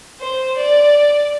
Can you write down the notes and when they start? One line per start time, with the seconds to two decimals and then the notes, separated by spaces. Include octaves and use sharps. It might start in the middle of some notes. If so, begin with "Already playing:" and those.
0.20 C5
0.58 D5